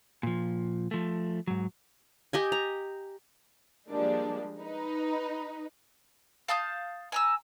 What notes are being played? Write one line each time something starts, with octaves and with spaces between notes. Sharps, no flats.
A#2 F3
F3 A3
G#2 F#3
G4 D#5 G#5
A#5
F3 G3 G#3 A#3 D4
D#4 B4
F5 A5 D#6 G6
G#5 A#5 E6